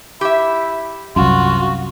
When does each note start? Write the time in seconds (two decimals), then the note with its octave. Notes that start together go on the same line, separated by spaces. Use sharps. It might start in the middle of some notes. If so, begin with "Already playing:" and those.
0.21 E4 G4 E5
1.16 C2 F#2 F4 F#4